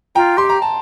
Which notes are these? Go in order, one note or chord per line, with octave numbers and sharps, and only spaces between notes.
F4 G5 A#5
G4 C6
A#5
A5